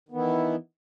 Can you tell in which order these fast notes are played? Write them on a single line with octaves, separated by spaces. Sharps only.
D#3 B3 E3 E4